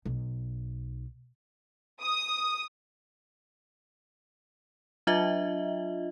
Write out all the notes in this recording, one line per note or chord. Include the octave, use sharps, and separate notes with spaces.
B1
D#6
F#3 D4 F4 D#5 E5